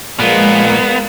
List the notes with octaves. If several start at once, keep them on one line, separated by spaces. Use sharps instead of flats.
A#2 F3 G#3 A#3 B3 D5